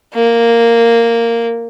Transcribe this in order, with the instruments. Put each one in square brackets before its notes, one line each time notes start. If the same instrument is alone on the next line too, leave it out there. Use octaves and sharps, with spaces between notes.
[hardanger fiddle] A#3